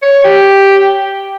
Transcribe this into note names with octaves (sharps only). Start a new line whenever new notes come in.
C#5
G4